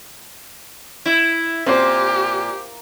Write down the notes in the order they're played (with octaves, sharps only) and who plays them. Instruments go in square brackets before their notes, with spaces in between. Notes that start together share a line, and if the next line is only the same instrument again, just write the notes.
[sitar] E4
[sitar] A#2 [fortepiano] C4 C5 [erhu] G4